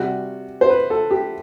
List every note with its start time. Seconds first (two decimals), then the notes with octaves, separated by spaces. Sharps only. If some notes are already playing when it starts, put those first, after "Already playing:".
Already playing: C3 G3 F#4
0.61 C5
0.70 B4
0.90 A4
1.11 G4